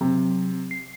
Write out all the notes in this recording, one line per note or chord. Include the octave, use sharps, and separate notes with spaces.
C3 F#3 C4
C7